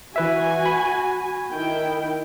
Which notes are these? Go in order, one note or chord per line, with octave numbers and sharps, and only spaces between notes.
E3 F#4 B4 E5 G#5
B5
D#3 E4 G5